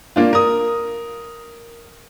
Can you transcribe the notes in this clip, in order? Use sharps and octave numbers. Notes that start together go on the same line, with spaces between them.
A#3 D4 F4
A#4 D#6